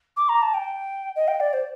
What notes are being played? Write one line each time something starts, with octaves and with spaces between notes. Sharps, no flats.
D6
A#5
A5
G5
D#5
G5
D5
C5